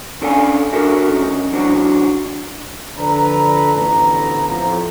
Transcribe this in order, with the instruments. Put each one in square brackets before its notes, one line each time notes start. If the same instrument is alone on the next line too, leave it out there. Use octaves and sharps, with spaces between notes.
[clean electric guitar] C#4 D4 A4 D5 F5 G#5
D4 F4 F#4 A4 A#4 E5
C2 C#3 D#4
E3 F#3 D4 F#4 C5
[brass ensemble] D3 F3 A4 B4 D5 A#5
A1 D2 A3 B3 A#5
F2 A2 F3